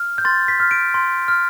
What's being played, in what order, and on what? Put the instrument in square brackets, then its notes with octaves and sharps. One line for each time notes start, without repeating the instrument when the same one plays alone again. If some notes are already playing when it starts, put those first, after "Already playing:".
Already playing: [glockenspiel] F6
G6
C6 A6
B6
F6
D7
C6
F6